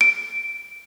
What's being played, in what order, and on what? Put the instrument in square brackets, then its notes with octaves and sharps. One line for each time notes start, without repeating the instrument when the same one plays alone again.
[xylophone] D7